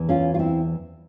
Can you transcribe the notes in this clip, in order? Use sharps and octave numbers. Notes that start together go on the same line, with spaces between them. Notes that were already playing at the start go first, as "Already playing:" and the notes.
Already playing: E2 E3
C#4 F4
F4
C4 E4